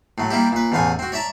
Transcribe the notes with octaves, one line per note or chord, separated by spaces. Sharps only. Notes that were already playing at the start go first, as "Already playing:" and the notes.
A2 F#3
G3 A#3 E4 G4
A#2 B4
A1 E2 A2 F5 F#5 G#5
C4 F#4
C#5 D5 E5 A5 A#5